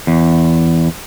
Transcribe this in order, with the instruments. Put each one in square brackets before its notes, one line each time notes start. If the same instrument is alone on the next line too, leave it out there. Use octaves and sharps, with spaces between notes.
[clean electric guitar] E2